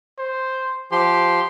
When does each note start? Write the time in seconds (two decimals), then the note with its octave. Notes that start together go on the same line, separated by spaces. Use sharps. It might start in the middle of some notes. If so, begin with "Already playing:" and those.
0.18 C5
0.92 F3 G4 C6